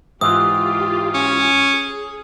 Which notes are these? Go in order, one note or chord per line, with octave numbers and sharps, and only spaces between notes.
G#2 E3 F4 G4 D#6
C#4
G#4